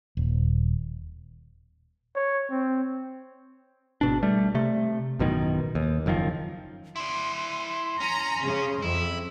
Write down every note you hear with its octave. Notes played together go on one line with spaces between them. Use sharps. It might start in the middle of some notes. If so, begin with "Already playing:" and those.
D#1
C#5
C4
G#1 B2 D4
G3 A3
C3 A3
A1 F#2 B2 D#3
D#2
F#1 F#2 D#3 F3
E4 D5 C6
C#4 A#5
C#3
F2 E4